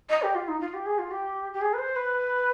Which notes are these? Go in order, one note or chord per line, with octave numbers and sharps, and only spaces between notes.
D#5
G4
F4
D#4
F4
G4
G#4
F4
G4
G4
G#4
B4
C5
B4